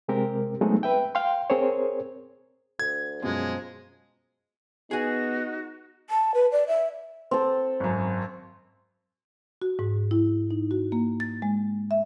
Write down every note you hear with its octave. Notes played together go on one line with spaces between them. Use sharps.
C3 G#3 C4 G4 A#4
F#3 G#3 A3 B3 C4 D#4
B4 E5 G5
F5 G5 C6
C4 G#4 A#4 C5 C#5
D2 G#6
F#2 B2 F3 G#3 C5
B3 D#4 F#4 G#4 G#5
A5
B4
D5
E5
C4 A4
G#1 F#2
F#4
G#2
E4
D#4
F#4
A#3
A6
G#3
E5